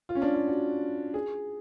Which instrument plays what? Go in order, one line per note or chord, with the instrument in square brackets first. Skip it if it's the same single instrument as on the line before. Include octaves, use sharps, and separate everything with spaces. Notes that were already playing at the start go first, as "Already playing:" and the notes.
[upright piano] F4
C#4
D4
F4
F#4
G#4